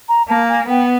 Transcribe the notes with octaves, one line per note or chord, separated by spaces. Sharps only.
A#5
A#3 A5
G#5
B3 G5